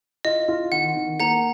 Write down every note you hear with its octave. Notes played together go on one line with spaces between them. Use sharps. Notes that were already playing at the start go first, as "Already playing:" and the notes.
F4 D#5
F4
D#3 F#5
D#3
A#3 F#5 A#5